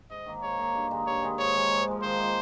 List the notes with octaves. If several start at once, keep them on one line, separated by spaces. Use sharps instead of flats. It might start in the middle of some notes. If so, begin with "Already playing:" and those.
G#2 D#5
D#3 A#3
G#2 C#5
D#3 A#3
G2
D#3 G#3 D#4
G2 C#5
D#3 G#3 D#4
G#2 C#5
F3 G#3
G#2
F3 G#3
D#3 C5
A#3 F4